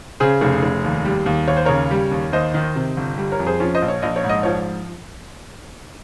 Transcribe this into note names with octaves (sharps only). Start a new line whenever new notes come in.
C#3 G#4 C5
F1
F1
D#2
G3
D#2
D#2 C#5
C5
C#3 A#4 C#5
G3
D#2
D#2 C5 D#5
D#3
C3
G1
G3
A#4 C#5
F2
G#4 C5
F3 C#4 F4
C5 D#5
A#1
C#5
A#1 D#5
C#5
G#2
D#5
F3 C#5